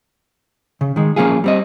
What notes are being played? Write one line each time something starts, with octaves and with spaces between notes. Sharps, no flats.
C#3
D#3 G#3
F3 A#3 C#4 F4 G#4
G3 C4 D#5